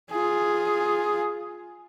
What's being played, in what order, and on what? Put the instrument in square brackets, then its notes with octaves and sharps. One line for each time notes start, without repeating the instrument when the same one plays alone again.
[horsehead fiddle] F4 G#4